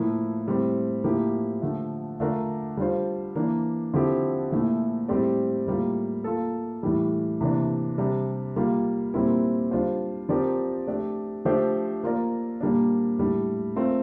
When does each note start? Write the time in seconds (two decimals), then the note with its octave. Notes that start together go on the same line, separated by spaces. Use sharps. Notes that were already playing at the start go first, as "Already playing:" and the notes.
Already playing: A2 F3 A#3 E4
0.47 A2 G3 C4
1.04 A2 F3 A#3 E4 G4
1.62 D3 F3 A3
2.20 D3 A3 D4 F4 A#4
2.77 G3 D4 F4 C5
3.36 E3 A#3 D4
3.93 D3 F3 C4 E4 G4
4.51 A#2 F3 A3 E4
5.08 A2 G3 C4 G4 D5
5.66 A2 G3 A#3 F4
6.24 A#3 F4 A4
6.83 A2 E3 G3
7.41 C3 E3 A#3 D4
7.98 C3 G3 D4
8.56 G3 A#3 F4
9.14 A#2 G3 C4 E4 A#4
9.71 G3 D4 F4 C5
10.29 F3 C4 G4 A#4 D5
10.87 A3 D4 G4 D5
11.45 F3 A3 D4 G4 C5
12.03 A#3 F4 A#4 D5
12.61 A#2 G3 A#3 D4
13.18 A2 G3 D4
13.76 A3 C4 F4 A#4